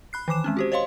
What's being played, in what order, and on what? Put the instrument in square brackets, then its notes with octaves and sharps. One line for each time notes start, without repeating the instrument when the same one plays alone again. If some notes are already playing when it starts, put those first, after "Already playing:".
[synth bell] B5 F#6 C7
D#3 E3 D6 E7
G#3 C4 C#4
F#4 G4 C5
C5 C#5 D#5 F5 C6